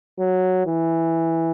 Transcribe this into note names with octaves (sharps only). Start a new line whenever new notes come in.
F#3
E3